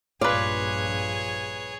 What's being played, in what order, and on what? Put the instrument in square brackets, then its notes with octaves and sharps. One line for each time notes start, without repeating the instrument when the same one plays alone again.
[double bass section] A#1 G2 [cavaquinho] F4 B4 [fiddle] G#4 C#5 [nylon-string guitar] D5